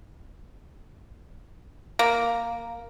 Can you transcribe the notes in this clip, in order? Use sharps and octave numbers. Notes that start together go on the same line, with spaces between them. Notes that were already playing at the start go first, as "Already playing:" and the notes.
A#3